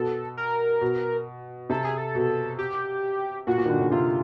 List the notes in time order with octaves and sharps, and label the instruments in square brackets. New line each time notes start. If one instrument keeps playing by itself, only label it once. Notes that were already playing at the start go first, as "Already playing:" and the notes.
Already playing: [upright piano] B2 [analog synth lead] A4
[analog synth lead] A#4
[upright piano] B2
[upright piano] C3 [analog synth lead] A4
[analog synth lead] G#4
A4
[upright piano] B2
[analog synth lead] G4
[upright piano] A#2 [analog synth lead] F#4
[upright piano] A#2
D#3
D3
C#3
[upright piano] C3 [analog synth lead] F4